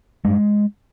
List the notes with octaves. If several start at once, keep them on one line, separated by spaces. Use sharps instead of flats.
G2 G#3